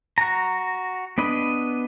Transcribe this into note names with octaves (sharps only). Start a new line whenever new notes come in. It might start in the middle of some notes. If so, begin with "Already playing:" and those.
F#4 A#5
B3 D4 B4 D#5